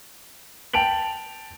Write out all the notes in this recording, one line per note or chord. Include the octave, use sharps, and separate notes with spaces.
G5 A5 D7 F7 F#7